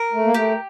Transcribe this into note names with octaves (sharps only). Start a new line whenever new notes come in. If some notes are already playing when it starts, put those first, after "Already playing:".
Already playing: A#4
A3
A#3
A3 G4